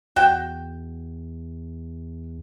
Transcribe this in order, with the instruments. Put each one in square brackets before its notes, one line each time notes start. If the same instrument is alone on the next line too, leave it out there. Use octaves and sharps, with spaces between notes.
[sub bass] E2 [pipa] F#4 G5